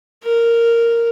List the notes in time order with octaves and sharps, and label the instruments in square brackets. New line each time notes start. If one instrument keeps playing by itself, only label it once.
[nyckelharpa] A#4